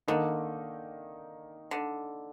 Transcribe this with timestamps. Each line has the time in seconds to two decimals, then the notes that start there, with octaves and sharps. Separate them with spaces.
0.08 D3 D#3 A#3 D#4
1.71 D3